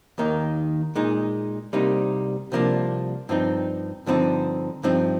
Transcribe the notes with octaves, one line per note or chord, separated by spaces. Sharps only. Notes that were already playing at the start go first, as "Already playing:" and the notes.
D#2 D#3 A#3 D#4
A#2 G#3 D#4
C2 C3 G3 A#3 D#4
C2 C3 F3 A#3 D4
G2 F3 C4 D#4
G2 D3 F3 C4 D#4
G2 F3 C4 D#4